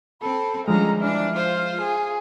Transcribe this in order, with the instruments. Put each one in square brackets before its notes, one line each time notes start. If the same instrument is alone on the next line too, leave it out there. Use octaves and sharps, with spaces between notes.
[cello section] C4 [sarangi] A4 [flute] B5
[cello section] D3 G3 C#4 [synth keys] F3 G#3 [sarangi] A#5 [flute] F6
[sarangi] E3 [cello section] D4 [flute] F6
[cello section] F4 [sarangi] C5
[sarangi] G#4